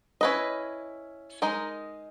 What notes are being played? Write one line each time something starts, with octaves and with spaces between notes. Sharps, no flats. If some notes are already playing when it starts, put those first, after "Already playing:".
C#4 E4 B4 D#5
G#3 D#4 A#4 D#5